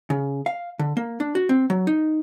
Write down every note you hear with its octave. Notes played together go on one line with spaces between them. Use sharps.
C#3
F5
D3
A#3
D4
F#4
C4
F#3
D#4